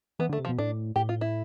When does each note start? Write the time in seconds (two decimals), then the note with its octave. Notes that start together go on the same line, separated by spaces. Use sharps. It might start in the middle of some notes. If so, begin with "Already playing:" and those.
0.19 E3 B3
0.29 D3 A3
0.39 C3
0.45 F3
0.49 B2
0.58 A2 D4
0.96 A2 G4
1.09 F4
1.21 E4